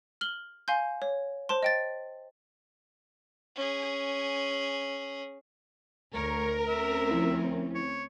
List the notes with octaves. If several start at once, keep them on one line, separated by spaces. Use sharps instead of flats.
F6 F#7 G7
F5 G#5 C6 G6
C#5
C5 A5 C6
D#5 G5 A6
C#4 G#4
D2 A#4 C#5
D2 C4 C#4 E5
F3 E4
C#5